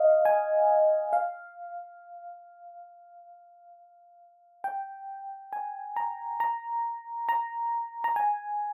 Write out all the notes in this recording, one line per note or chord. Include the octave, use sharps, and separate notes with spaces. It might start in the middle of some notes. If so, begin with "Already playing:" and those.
Already playing: D#5 F5
G#5
F5
G5
G#5
A#5
A#5
A#5
A#5
G#5